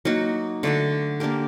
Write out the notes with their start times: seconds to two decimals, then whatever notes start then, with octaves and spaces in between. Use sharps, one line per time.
0.05 F#3 A#3 D#4 F#4
0.63 D3 A3 D4 F#4
1.20 A#3 D4 G4 A#4